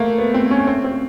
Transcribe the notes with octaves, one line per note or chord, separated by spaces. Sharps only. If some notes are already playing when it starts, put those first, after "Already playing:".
Already playing: A3 A#3
B3
C4
C#4
C4
C4